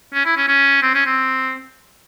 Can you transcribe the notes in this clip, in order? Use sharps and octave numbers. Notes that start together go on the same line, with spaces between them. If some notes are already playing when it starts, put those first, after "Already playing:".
C#4
E4
C#4
C#4
C4
C#4
C4